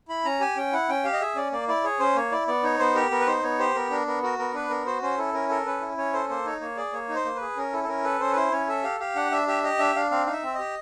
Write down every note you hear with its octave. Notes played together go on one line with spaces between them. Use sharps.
E4 B5
C#4 A#5
G4 G#5
C#4 G5
E4 F#5
C#4 G5
G4 F5
D#5
G#4 E5
C#4 D5
A#3 D5
E4 D5
G#4 C#5
C#4 C5
A#3 C#5
E4 D5
B3 D5
D#4 C#5
B3 C5
G4 A#4
B3 A#4
B4
D#4 C5
B3 C#5
G4 C5
B3 A#4
D4 A#4
B3 A#4
F#4 A#4
B3 A#4
D4 B4
B3 A#4
F#4 C5
C#4 C5
E4 A4
C#4 A#4
A4 A#4
C#4 B4
E4
C#4 C#5
A4 C5
A#3 C5
D#4 C#5
A#3 C#5
G#4 D5
A#3 C#5
D#4
C5
A#3
B4
G#4
C#4 A#4
E4 A4
A4
C#4 A#4
A4 B4
C#4 C5
B4
E4 C5
C#4 C#5
A4 E5
G4 F5
G4 F5
D4 F#5
D4 E5
G4 E5
G4 D#5
D4 E5
D4 F5
C4 F5
D#4 F5
E5
C4
G4 D#5